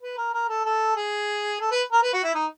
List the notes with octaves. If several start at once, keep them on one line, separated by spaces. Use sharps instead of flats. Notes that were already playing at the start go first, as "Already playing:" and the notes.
B4
A#4
A#4
A4
A4
G#4
A4
B4
A#4
B4
F#4
E4
D#4